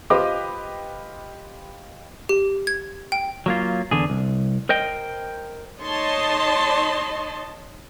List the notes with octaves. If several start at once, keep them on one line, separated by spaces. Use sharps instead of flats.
F4 G4 B4 C5 D#5 D6
G4
G#6
G5
F#3 A#3 F4
E2 D3 G#4
C2
A#4 C5 D#5 G5
D#4 C#5 D#5 A5 C6